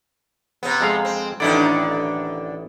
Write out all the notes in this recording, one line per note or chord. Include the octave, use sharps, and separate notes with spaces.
C3 B3
F2 G#3 F5
C4
A1 D3 D#3 D4 E4 D5